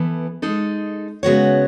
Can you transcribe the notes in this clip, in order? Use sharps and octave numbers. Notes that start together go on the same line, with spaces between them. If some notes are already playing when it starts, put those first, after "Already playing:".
Already playing: E3 B3 E4 A4
G#3 D#4 A4
C#3 G#3 B3 F#4 C#5